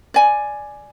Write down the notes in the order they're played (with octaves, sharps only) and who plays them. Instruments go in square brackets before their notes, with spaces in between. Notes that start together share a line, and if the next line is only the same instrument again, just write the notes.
[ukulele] D5 G#5